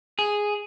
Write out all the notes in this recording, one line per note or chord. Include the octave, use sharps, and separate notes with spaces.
G#4